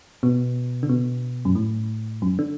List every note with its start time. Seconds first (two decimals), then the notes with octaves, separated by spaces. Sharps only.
0.23 B2
0.83 D3
0.89 B2
1.45 F#2
1.55 A2
2.22 F#2
2.39 D3